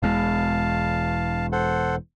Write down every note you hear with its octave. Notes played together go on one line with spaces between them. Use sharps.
E1 E2 G#3 F5 A5
A4 C5 F#5